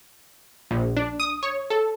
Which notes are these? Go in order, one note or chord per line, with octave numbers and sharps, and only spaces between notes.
A#1
D4
D#6
C#5
A4